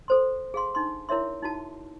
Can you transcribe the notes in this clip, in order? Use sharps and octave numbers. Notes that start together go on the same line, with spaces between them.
A4 C5 C6
G#4 F5 C6
D4 D#4 C6
E4 A#4 C#5 E5 C6
D#4 E4 F#4 A5